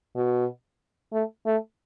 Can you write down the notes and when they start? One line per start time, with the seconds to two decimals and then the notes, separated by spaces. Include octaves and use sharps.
0.16 B2
1.12 A3
1.46 A3